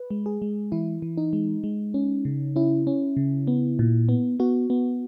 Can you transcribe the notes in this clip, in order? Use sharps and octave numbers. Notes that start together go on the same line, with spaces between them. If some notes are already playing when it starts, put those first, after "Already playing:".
Already playing: B4
G#3
G#4
G#3
E3 E4
E3
D#4
G#3
G#3
C#4
C#3
C#4 E4
C#4
C#3
B3
A#2
B3
B3 F#4
B3